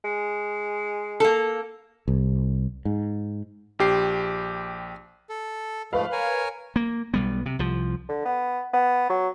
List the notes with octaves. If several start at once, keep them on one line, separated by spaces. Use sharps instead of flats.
G#3
A#3 A4
C2
G#2
A#1 G4 C7
A4
G#2 F3 A3 B4 F5
A#4 C#5 G#5
A#3
B1 G3 B3
C3
C2 F3
D3
B3
B3
F#3